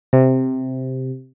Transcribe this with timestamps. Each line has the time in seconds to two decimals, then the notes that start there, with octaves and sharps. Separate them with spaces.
0.13 C3